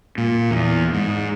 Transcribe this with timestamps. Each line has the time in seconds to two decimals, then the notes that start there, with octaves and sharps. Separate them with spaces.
0.18 A#2
0.51 E2
0.94 G#2